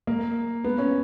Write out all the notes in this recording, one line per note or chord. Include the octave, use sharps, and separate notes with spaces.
A#3
B3
C#4